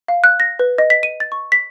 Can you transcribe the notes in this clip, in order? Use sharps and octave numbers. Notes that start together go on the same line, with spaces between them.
F5
F#6
A#6
B4
D#5
B6
D#7
A6
C#6
B6